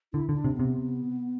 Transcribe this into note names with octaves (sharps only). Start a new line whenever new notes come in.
D3 E4
D3 E4
D4
C3
C3 B3